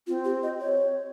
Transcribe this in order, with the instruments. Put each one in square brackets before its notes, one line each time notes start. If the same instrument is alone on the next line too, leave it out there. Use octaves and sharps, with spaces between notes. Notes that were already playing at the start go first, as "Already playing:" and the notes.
[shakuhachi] C4 [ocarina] F4
[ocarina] G4
D#5
C#5